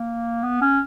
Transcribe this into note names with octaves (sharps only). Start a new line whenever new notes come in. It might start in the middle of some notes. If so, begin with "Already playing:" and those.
Already playing: A#3
B3
C#4